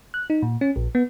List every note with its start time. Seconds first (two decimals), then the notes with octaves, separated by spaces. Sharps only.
0.14 F#6
0.30 D#4
0.42 A#2
0.61 C#4
0.76 A#1
0.95 B3